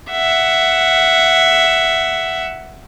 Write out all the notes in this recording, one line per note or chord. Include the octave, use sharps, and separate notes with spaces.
E5 F#5